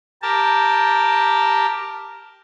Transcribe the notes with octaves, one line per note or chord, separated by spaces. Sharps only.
G4 A#4 A5